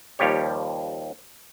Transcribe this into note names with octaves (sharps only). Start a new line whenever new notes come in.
D#2 F3 G3 G4 C#5